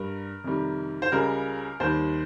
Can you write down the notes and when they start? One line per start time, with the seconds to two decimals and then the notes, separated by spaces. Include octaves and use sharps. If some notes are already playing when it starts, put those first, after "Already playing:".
Already playing: G2 G3 A#4
0.44 F2 C3 D#3 G3
1.02 C5
1.12 C#2 C#3 G3 A#4
1.80 D#2 D#3 G3 C5